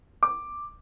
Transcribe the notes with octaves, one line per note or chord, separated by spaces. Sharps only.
D6